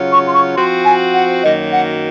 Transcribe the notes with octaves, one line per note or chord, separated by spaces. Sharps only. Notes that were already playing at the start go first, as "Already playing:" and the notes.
Already playing: C#3 F#3 C#4 F4
C#6
C6
C#6
F3 C4 F#4 C6
G#5
F#5
F#2 D#3 F#3 A#3 D#5
F#5